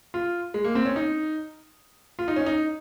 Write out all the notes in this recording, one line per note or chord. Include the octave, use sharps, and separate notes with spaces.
F4
G#3
A#3
C4
C#4
D#4
F4
D#4
C#4
D#4